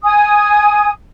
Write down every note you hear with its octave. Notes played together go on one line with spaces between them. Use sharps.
G#5 D#6